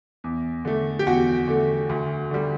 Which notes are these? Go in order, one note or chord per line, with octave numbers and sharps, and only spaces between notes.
E2
D3 A3
G4
E2 F#4
D3 A3
D2
D3 G3